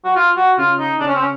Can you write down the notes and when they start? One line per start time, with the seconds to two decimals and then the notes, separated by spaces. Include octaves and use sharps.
0.05 F#4
0.16 F4
0.37 F#4
0.58 C#3 F4
0.79 D#4
1.00 C#3 D4
1.07 C#4
1.15 C4
1.22 C#4